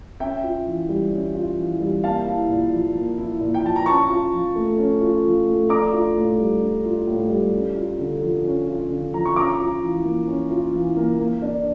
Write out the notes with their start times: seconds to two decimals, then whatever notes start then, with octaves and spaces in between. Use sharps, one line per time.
0.20 C#4 E5 G5
0.43 F4
0.66 E3
0.89 G3
1.11 C#4
1.35 F4
1.58 E3
1.80 G3
2.04 A#3 F5 A5
2.26 E4
2.49 A#2
2.72 F3
2.95 A#3
3.18 E4
3.41 A#2
3.54 G5
3.64 F3 A5
3.76 A#5
3.86 C#4 A5 C#6
4.09 F4
4.33 F3
4.55 A3
4.78 C#4
5.01 F4
5.24 F3
5.46 A3
5.69 D4 A#5 D6
5.93 F4
6.16 A2
6.38 G3
6.62 D4
6.85 F4
7.07 A2
7.30 G3
7.53 C#4
7.76 F4
7.99 D3
8.22 F3
8.44 C#4
8.67 F4
8.90 D3
9.14 F3 A#5
9.25 C#6
9.36 C#4 A#5 D6
9.59 F4
9.82 E3
10.05 A#3
10.28 C#4
10.50 F4
10.73 E3
10.96 A#3
11.19 A#3
11.42 D4